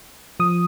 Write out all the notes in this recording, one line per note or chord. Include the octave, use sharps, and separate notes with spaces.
F3 D#6